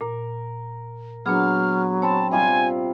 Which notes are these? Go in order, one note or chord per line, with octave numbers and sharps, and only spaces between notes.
A#2 A#4
F#3 A#3 B3 D4 G#4 F6
C4 C#5 A5 B5 C6
C3 G3 F4 G#5